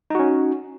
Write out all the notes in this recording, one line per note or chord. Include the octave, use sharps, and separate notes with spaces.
C#4 D#4 F#4